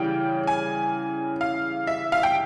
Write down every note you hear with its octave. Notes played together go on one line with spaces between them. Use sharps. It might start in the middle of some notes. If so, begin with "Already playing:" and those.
Already playing: C#3 E3 G3 G5
G#5
F5
E5
F5
G5